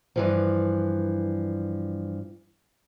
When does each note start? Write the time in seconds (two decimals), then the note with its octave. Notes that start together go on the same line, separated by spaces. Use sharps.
0.16 G2 E3 F3